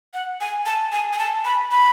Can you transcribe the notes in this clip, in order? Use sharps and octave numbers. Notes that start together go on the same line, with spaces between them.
F#5
G#5
A5
G#5
G#5
A5
B5
B5